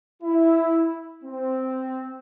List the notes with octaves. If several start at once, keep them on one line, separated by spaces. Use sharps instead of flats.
E4
C4